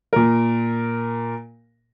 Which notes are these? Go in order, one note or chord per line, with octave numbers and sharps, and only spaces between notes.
A#2 A#4